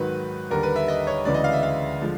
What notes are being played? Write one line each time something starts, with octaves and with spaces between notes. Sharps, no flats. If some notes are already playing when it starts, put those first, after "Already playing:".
Already playing: G#2 D#3 F#3 B4
D#2 D3 G3 A#4
B4
E5
D#5
C#5
D2 C#3 E3 G#3 D5
D#5
F5
E5
F5
D3 F3 G#3